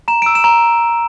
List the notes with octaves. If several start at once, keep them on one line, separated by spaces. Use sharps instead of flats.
A#5 E7
E6 D7
E7
A#5